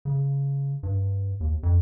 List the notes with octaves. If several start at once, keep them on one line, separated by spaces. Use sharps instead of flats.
C#3
G2
D#2
F2